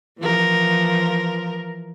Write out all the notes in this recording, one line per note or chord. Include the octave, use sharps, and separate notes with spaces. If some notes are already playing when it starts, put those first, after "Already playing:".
E3 F3 A#4